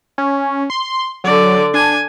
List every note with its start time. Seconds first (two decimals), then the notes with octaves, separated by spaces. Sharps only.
0.18 C#4
0.70 C6
1.24 D3 F#3 D5
1.74 D4 G#5